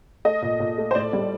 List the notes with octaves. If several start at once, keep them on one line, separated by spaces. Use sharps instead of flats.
A3 D#5
A#2
A#2
A3
C5
A2 D5
G3